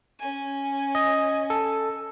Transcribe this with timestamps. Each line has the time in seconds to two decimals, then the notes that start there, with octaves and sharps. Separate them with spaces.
0.19 C#4 G#5
0.95 D#5
1.50 A4